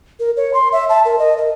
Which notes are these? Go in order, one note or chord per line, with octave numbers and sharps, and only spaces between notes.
A#4
C#5
C6
E5
A5
A#4
D#5
A#4